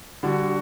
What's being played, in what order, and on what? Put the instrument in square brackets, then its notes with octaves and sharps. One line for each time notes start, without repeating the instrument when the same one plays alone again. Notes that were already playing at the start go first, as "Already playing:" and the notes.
[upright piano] D3 G3 D4 [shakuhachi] F#4